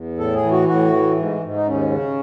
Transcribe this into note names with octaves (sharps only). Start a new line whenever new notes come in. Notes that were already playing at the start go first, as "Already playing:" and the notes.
Already playing: E2
A2 A4
G#4
E3
F#4
A2 F#4
E3
G#2
G#2
D#4
D#2 C#4
C#3